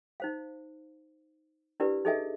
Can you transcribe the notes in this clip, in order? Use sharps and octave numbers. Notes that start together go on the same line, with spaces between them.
D#4 C5 F5
D4 E4 G4 A#4 B4 D5
D#4 G#4 A4 D#5 E5 G#5